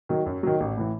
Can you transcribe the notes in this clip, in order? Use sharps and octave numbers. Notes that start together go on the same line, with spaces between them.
D#3 F#3
F#2
D#3 F#3
A1
A2 E3